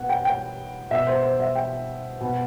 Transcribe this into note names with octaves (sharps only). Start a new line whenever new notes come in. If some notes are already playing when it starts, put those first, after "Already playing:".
Already playing: B2 B4 F#5
G5
G5
B2 E5
C5
C5
E5
G5
B2